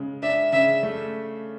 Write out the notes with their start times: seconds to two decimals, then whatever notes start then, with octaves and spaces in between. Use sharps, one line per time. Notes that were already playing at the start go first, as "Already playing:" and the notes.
Already playing: C#3 G#3
0.22 D4 E5
0.52 C#3 E5
0.83 A3